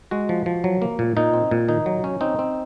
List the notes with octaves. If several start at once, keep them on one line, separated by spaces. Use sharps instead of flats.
G#3 F#4
F3
F3
F#3
A#3
A#2
A#2 D#4
C4
A#2
D#3 D#4
F#3
C#4
C4 D#4
C4